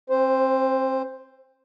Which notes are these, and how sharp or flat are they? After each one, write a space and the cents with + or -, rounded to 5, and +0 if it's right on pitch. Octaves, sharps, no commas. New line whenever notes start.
C4 +30 C5 +0